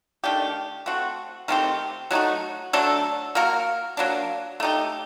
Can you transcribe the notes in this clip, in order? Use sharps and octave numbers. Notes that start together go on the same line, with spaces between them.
D#3 A3 D4 G4
A3 C4 F#4
D#3 A3 C4 G4
F#3 A3 D#4 F#4
F#3 A3 D4 A4
A#3 F#4 A#4
F#3 A#3 D4
A3 D#4 G4